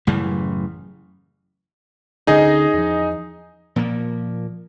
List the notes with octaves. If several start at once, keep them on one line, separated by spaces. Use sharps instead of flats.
A1 F#2 C#3 E3
D2 D3 C#4 D#4 G#4 D#5
E2 F3
A#2 F3 A#3